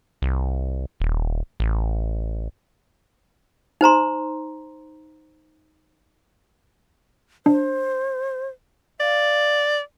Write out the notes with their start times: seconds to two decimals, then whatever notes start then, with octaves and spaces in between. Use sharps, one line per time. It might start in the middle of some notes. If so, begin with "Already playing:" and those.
0.22 C2
1.00 D#1
1.60 A1
3.81 D#4 C5 A#5 C6
7.46 D4 C5
9.00 D5 F5